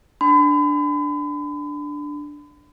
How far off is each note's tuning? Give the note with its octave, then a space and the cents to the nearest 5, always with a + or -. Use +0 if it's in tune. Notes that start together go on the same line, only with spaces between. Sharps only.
D4 +0 B5 +40